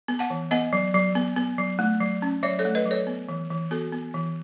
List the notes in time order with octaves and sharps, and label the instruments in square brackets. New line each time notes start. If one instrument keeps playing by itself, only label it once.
[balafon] B3
F#5 A5
E3
B3 D#5 F#5
F#3
F#3
B3
B3
F#3
A3
F#3
C#4
F#3 C#5 E5
A4 C#5
A3
B4 D#5
F#3
A4 C#5
B3
E3
E3
B3 F#4 A4
B3
E3